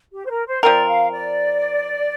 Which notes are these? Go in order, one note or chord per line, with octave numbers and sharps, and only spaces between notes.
G4
C5
A#4
C5
F3 C4 A#4 D5
F5
D5